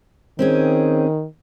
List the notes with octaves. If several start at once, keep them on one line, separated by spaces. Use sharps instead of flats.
D#3 C4 C#4 G#4